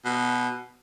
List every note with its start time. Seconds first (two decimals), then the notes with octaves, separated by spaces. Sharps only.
0.05 B2